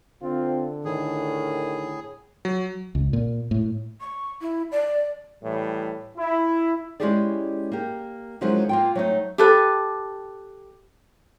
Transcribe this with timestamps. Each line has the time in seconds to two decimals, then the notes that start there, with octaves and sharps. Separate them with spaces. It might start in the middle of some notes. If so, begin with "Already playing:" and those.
0.22 D3 C4 F4
0.85 A2 D#3 G#4
2.45 F#3
2.95 C#2
3.13 A#2
3.51 A2
4.00 C#6
4.41 E4
4.72 D5
5.43 A2 E3 G3
6.17 E4
7.00 G#3 C#4 E4 G4 G#4 D5
7.72 A#3 G4
8.41 D#3 F3 F#3 G#3 C#4 E4
8.69 A#3 F4 G5
8.95 F#3 A3 D#4
9.38 G4 A4 B4